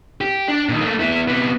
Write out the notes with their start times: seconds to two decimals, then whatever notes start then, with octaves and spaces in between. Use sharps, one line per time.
0.21 G4
0.48 D4
0.69 A#2 D#3
0.81 A3 A#3
1.00 B3 E4
1.28 C3 B3